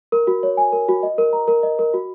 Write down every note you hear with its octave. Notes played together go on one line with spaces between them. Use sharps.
A#4
F#4
C#5
G#5
A#4
F#4
D#5
A#4
A#5
A#4
D#5
A#4
F#4